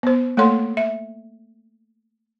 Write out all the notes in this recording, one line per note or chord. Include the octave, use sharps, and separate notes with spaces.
B3 C5
A3 A#3 A4 C#5 C6
E5